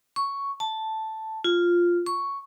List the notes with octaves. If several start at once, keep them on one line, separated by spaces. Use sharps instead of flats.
C#6
A5
F4
C#6